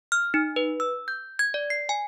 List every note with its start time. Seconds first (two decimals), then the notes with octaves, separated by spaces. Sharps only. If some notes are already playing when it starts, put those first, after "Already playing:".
0.12 F6
0.34 D#4
0.56 B4
0.80 E6
1.08 G6
1.39 G#6
1.54 D5
1.70 C7
1.89 G#5